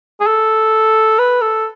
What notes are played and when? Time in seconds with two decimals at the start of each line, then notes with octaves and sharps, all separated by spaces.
0.21 G#4
0.27 A4
1.19 B4
1.42 A4